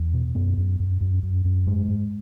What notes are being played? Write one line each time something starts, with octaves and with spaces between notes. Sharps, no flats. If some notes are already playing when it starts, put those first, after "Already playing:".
Already playing: E2
B2
F#2 B3
F#2
F#2
F#2
F#2
F#2
G#2 G#3
G#2